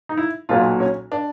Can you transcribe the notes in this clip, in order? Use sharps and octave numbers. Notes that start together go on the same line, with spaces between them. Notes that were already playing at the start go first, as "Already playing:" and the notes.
D#4
E4
B1 A#2 F#3 F4
C#4
D4